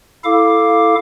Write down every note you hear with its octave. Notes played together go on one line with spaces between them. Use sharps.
E4 A4 F5 D6